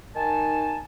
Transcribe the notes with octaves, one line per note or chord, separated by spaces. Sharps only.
D#3 D#4 G#5 A5